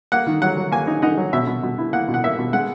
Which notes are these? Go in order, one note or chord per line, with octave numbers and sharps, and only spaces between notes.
A#3 F#5
D#3
F#3 F#5
F#3
A#3 G#5
D#4
D#4 F#5
F#3
B2 E5
B2
B2
E4
A#3 F#5
B2
F#5
A#3 E5
B2
G#3 F#5